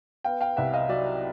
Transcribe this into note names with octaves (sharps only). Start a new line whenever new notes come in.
B3 F5 G5
F5 G5
C2 E5 F#5
D#5 F5
F#3 D5 E5